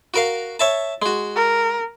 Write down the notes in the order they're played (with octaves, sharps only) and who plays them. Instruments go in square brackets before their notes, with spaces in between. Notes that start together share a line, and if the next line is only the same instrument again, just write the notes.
[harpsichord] F#4 A#4 F5
C#5 E5 A5
G#3 F#4
[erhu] A#4